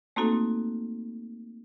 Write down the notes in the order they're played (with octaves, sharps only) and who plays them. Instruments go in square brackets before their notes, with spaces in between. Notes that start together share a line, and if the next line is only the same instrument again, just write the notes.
[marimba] A3 A#3 C4 D#4 F#4 A4